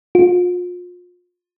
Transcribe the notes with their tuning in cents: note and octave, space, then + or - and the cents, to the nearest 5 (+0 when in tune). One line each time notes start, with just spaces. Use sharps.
F4 +35